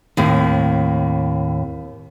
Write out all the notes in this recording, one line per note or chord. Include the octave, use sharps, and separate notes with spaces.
D#2 A2 C4